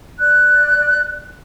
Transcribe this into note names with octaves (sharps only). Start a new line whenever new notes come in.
D5 F#6